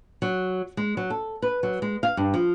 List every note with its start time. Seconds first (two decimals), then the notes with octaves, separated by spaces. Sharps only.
0.22 F#3
0.77 G#3
0.97 F#3
1.10 A4
1.42 B4
1.63 F#3
1.82 G#3
2.03 F5
2.17 G2
2.34 F3